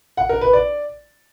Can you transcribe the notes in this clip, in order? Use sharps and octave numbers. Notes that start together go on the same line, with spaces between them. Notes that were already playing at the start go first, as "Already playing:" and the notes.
F#5
A#4
B4
D5